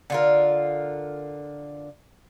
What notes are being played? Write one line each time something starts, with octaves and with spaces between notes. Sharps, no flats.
D3 F4 A#4